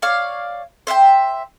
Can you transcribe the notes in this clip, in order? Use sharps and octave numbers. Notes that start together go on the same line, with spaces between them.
C#5 D5 F5
C5 E5 F5 G5